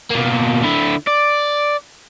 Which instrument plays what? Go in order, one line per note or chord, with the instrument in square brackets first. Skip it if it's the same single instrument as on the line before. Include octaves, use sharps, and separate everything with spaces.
[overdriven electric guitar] B2 A#3
D3 E4
D5